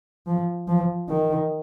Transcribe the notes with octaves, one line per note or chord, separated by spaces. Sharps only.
F3
F3
D#3